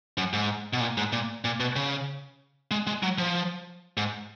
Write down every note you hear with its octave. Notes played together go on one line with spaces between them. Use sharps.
F#2
G#2
B2
A#2
G#2
A#2
A#2
B2
C#3
G#3
G#3
F#3
F3
G#2